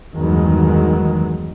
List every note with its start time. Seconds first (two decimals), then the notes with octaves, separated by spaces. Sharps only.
0.14 E2 G2 D#3 F#3 G#3